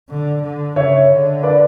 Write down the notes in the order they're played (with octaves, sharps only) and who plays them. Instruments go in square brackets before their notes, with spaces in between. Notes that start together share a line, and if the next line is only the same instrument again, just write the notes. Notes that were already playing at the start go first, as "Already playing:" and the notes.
[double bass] D3
D3
[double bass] C#3 [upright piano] C#5 E5
[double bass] D3
[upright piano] B4 D5